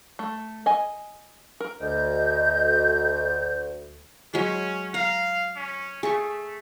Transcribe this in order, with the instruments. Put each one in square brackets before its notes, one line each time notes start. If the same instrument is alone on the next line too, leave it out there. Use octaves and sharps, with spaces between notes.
[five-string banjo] A3
D#5 G#5
A#4
[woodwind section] D2 [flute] D#5 [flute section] G6
[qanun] F#3 G#3 [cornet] C#4
[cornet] F5 [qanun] A#5
[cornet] C#4
[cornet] A3 [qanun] G#4 C#6